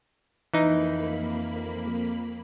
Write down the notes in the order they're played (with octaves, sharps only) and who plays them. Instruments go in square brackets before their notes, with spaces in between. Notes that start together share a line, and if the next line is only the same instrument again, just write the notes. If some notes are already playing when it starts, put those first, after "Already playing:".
[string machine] F2 A#3 B5 [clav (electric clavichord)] E3 D#4